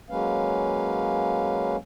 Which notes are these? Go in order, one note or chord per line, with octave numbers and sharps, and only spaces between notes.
F#3 G#3 A#3 C#4 B4 F5